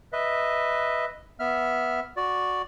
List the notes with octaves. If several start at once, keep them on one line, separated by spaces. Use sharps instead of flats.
B4 D#5 E5
B3 E5 F6
F#4 D5